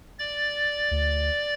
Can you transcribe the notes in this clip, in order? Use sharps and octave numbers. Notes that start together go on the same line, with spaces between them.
D5 A6
D2